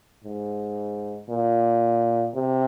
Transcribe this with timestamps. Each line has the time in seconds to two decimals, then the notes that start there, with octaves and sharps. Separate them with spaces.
0.24 G#2
1.29 A#2
2.35 C3